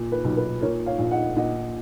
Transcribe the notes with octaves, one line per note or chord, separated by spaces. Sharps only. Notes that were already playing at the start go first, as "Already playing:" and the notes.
Already playing: A#2
B4
B1
B4
A#2 A#4 C#5
C#5 F5
A#1
D#5 F#5
A#2 D#5 F#5